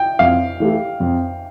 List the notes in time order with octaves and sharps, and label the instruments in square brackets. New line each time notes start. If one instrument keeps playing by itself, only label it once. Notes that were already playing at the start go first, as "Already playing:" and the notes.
Already playing: [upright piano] G5
[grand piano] F2 [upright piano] F5
[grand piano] E3 A3 E4 G4
F2